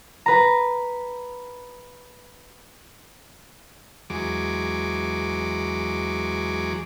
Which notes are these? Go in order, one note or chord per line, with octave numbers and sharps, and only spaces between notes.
B4 A#5
E2 F#3 G#3 D6